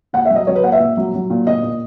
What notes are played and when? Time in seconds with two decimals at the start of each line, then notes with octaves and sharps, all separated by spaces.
0.13 A#2 F#5
0.25 E5
0.30 F#3
0.36 D#5
0.47 F#3 C#5
0.55 B4
0.64 A#2 F#5
0.72 E5
0.80 A#2
0.97 F#3
1.14 F#3
1.30 A#2
1.47 A#2 D#5
1.64 A#2